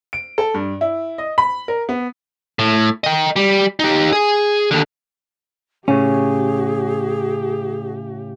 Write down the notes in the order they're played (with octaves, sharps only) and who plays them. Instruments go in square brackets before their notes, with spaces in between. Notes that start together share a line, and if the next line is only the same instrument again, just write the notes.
[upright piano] D7
A4
G2
E4
D#5
B5
A#4
B3
[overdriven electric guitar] A2
D#5 G5
G3
D#4 G4
G#4
D#2 D3
[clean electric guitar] A2 C#3 [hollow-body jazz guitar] C#4 [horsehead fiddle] G4 [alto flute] G#4